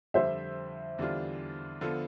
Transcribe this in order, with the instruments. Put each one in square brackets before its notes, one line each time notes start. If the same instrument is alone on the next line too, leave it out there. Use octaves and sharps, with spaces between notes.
[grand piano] F2 D3 G3 [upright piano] C5 E5
[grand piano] E2 D3 G3 D4 F4
D3 F3 B3 F4 A4